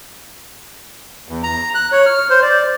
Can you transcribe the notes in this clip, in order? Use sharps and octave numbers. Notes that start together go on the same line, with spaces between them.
E2
A#5
F#6
C#5
F6
C5
D5